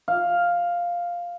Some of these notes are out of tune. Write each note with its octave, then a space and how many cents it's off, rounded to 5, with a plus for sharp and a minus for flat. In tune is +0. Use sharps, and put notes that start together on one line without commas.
F5 +0